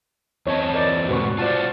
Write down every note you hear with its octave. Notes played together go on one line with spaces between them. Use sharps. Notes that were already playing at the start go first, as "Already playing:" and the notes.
E2 C4 C#5 D#5 A5 C#6
A#4 D5 D#5
G#2 B2 F#4 B4 C#6
F4 F#4 C5 D5 F#5 A5